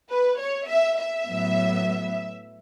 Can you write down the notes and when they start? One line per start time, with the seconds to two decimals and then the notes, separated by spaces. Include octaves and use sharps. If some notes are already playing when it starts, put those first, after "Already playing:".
0.10 B4
0.39 C#5
0.68 E5
0.97 E5
1.26 A2 F#3 B3